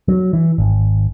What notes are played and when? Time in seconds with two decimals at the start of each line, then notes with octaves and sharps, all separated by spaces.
0.08 F#3
0.33 E3
0.58 G#1